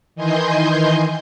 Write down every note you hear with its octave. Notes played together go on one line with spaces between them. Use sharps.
D#3 E3 D#5 G#5 C6 G6